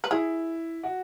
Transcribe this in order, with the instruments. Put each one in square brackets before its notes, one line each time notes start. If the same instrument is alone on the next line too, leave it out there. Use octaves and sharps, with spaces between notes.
[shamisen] B4
[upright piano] E4 [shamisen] G#4
[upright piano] F#4